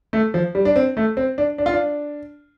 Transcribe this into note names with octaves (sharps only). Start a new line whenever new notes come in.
A3
F3
G3
D4
C4
A3
C4
D4
D4
F4
D4